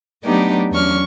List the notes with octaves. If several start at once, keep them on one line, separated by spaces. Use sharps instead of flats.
F#3 A3 B3 D4 D#4 G4
E2 F#3 C#4 D4 C#6 F6